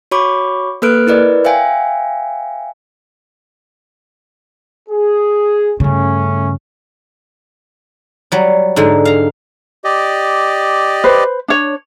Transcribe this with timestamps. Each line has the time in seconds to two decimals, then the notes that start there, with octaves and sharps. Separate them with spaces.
0.11 F#4 C#5 B5 C#6 D6
0.82 A#3 A4 B4 F6 F#6 D7
1.07 E4 A#4 B4 D5 D#5
1.45 C5 E5 F5 G5 G#5
4.89 G#4
5.80 G2 C#3 A3 C#4
8.32 F#3 G3
8.76 G#2 D3 G#3
9.05 F5 A#5
9.84 G4 D5 D#5
11.04 B4 C5
11.48 D4 C#5